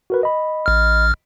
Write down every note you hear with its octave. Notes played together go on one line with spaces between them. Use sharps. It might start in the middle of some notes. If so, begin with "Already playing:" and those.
F#4 A#4 B4
D#5 B5
A1 F6